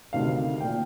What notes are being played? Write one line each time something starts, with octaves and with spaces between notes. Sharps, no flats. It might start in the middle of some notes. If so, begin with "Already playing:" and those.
D2 C3 D#3 F5
A#2 G5